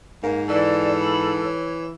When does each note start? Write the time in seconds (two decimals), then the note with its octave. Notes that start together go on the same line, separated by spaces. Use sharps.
0.23 G#2 A#3
0.49 E3 A4 D5
1.00 B5
1.44 C#5